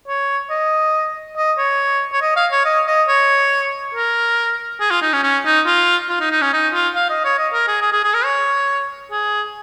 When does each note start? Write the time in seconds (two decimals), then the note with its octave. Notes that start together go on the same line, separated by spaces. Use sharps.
0.08 C#5
0.50 D#5
1.37 D#5
1.58 C#5
2.13 C#5
2.22 D#5
2.36 F5
2.52 C#5
2.65 D#5
2.88 D#5
3.08 C#5
3.95 A#4
4.80 G#4
4.91 F4
5.02 D#4
5.13 C#4
5.23 C#4
5.45 D#4
5.66 F4
6.09 F4
6.20 D#4
6.31 D#4
6.42 C#4
6.53 D#4
6.74 F4
6.96 F5
7.10 D#5
7.25 C#5
7.38 D#5
7.53 A#4
7.68 G#4
7.82 G#4
7.93 G#4
8.04 G#4
8.14 A#4
8.25 C#5
9.11 G#4